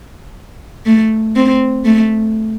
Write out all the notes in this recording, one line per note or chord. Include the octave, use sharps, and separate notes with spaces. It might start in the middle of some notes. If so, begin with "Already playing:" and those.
A3
C4
A3